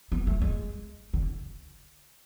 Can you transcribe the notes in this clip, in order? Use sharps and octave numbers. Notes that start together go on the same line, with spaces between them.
B3
A3
G#3
D3